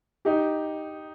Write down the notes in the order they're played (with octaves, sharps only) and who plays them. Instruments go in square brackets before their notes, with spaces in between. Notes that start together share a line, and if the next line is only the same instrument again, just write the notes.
[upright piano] D#4 G4